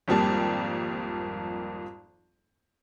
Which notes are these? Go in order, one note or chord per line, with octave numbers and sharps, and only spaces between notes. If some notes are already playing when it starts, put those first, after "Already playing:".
G#1 F2 G3 A#3 A5